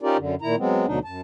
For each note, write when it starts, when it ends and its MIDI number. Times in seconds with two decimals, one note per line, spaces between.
0.02 0.17 61
0.02 0.17 63
0.02 0.17 65
0.02 0.17 67
0.02 0.17 70
0.02 0.17 74
0.18 0.35 42
0.18 0.35 50
0.42 0.56 46
0.42 0.56 51
0.42 0.56 64
0.42 0.56 82
0.58 0.86 54
0.58 0.86 56
0.58 0.86 59
0.58 0.86 60
0.87 0.99 38
0.87 0.99 47
0.87 0.99 50
0.87 0.99 54
0.87 0.99 62
0.87 0.99 63
1.04 1.21 42
1.04 1.21 81